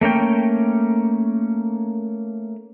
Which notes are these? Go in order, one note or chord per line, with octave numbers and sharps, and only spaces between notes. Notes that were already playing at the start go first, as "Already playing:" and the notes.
A3 A#3 C#4 G5